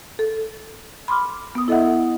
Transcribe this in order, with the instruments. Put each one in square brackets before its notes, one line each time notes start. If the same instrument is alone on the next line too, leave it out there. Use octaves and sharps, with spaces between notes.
[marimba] A4
B5 C6 D6 F6
B3 D#6
E4 A4 D#5 E5 F#5